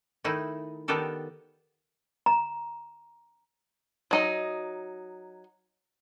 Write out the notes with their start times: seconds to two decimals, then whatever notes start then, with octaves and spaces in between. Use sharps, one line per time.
0.24 D#3 A3 D#4 E4
0.88 D#3 B3 D4 G4 A4 A#4
2.26 A#5
4.11 F#3 D#4 D#5